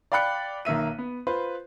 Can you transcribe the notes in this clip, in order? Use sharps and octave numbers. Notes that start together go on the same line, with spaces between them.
D5 F5 G5 B5 F#6 C#7
B1 D#3 A#3 E5 D#7
B3
F4 B4 C5